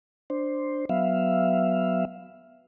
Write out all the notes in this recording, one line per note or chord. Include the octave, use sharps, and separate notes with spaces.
D4 C5
F#3 B3 E5 F5